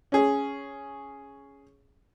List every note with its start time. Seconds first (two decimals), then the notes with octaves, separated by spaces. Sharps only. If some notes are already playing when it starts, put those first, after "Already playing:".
0.12 C#4 G#4